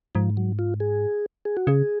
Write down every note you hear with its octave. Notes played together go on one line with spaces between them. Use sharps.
G#2 F3
F#3
F4
G#4
G#4
F#4
C#3 G#4